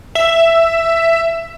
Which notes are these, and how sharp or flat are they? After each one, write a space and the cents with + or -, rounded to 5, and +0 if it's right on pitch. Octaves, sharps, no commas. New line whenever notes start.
E5 +10